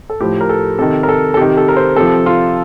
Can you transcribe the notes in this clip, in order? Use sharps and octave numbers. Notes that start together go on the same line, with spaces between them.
A4
A2 F3 G4
A#4
A4
C3 D#3 A4
A#4
A4
A4
C3 D#3 G4
A4
A#4
C5
C3 F3 A4
F4